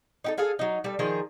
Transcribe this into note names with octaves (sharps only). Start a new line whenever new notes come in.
D#4 G4 A4
G#4 A4 F5 G#5
F#3 D#4
G3 A4
D#3 F3 G#4